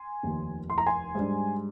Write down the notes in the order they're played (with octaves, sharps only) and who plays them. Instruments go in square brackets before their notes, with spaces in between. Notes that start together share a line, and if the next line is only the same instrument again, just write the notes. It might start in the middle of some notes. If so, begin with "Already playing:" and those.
Already playing: [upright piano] G#5 C6
F1 D#2 D#3
C6
A#5
G#5 C6
G#2 G3 D4